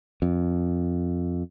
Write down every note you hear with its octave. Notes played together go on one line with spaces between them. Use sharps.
F2